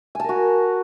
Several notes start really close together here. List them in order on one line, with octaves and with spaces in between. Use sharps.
G#5 A5 A#4 F#4